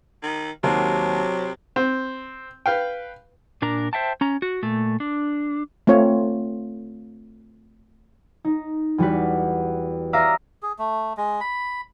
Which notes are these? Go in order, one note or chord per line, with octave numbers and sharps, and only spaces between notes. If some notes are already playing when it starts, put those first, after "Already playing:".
D#3
D#2 C3 F#3
C4
B4 F5 G5
A#2 D4 A#4 A#5
C5 E5 G5 A5
C#4 A#5
F#4
A#2 A3
D4
A3 C4 F4 C#5
D#4
E2 G3 F#4 B4
D5 E5 F5 A#5 D#6 A#6
G#4
A3
G#3
B5